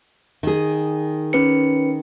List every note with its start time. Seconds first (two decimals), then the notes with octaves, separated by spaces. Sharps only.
0.43 D#3 G#4
1.33 C#4 B4 C#7